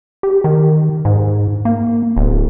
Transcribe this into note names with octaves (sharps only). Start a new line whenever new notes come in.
G4
D#3
G#2
A#3
D1